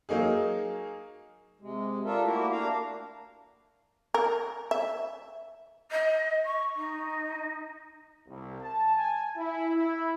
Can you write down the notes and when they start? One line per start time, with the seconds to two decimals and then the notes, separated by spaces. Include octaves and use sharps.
0.09 F#3 A#3 D#4 G#4
1.61 C3 G#3
2.05 D4 F4 A4 A#4 E5
2.24 A3 A#3 E4 F#4 G4
2.51 A#3 D4 F5 A#5
4.14 A#4
4.71 E5
5.91 D#5
6.45 C#6
6.76 D#4
8.27 C2
8.61 A5
8.96 G#5
9.37 E4
9.75 E4